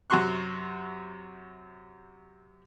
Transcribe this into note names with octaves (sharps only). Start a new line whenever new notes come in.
F#2 C3 F#4 C6 C#6 F#6